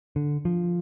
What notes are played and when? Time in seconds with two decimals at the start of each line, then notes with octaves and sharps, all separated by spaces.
0.16 D3
0.45 F3